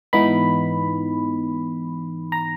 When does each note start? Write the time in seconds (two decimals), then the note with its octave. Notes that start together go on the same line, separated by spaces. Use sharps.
0.13 G#2 E3 B3 D#4 B5
2.32 A#5